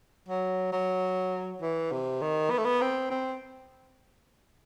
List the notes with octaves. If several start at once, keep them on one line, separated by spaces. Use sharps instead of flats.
F#3
F#3
E3
C3
D#3
B3
A3
B3
C4
C4